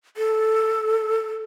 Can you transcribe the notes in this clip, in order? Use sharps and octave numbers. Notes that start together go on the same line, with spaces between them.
A4